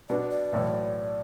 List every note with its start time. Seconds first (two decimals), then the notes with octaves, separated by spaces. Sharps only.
0.09 B2 B3 D4 D5
0.31 D5
0.52 B1 A2 E3